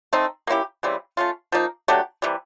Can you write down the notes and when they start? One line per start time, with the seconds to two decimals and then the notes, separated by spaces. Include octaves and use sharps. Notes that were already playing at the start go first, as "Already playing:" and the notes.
0.13 A3 C4 D#4
0.47 A#3 C#4 E4 G4
0.83 C#3 E3 G3 C4
1.17 A3 C#4 F4
1.52 F3 A#3 D#4
1.88 F#3 A3 D4 G4
2.22 C3 E3 G3